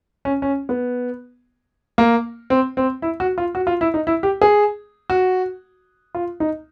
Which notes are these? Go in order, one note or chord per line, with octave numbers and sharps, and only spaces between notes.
C#4
C#4
B3
A#3
C4
C4
E4
F#4
F4
F#4
F4
E4
D#4
E4
G4
G#4
F#4
F4
D#4